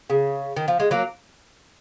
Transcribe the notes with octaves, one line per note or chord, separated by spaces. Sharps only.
C#3
D#3
F3
G#3
F#3 A#3